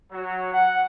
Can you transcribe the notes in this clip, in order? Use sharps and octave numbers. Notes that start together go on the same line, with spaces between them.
F#3
F#5